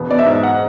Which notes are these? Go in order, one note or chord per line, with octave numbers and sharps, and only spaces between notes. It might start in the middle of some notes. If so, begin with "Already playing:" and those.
Already playing: E1 B3
B3 D5
E5
G#2
F#5